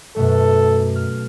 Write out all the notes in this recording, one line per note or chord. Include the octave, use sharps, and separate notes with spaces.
F#2 B2 A3 A4
F6